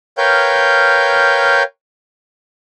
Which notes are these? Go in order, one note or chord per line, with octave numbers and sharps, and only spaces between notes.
A#4 B4 C#5 F5 G5 G6